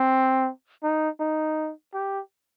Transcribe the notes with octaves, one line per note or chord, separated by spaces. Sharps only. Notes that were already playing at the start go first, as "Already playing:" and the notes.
Already playing: C4
D#4
D#4
G4